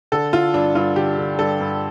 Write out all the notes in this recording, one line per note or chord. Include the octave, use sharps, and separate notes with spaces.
D3 A4
D3 F4
G2 D4
G2 F4
D3 G4
D3
G2 A4
G2